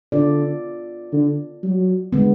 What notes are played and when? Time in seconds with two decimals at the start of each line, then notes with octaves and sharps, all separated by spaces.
0.12 D3 B3 F4 A4 D5
1.13 D3
1.63 F#3
2.12 D3 G#3 B3